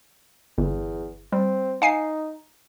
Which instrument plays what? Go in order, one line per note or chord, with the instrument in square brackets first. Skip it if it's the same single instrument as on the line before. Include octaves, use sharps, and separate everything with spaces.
[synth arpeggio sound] G1 [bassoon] E2
[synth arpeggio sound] G3 [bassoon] C4
[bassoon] D#4 [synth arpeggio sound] F5 G#5 C7